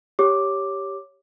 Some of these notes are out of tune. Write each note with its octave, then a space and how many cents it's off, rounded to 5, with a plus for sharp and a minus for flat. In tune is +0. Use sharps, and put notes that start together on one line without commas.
G4 +0 C#5 +0 D6 +0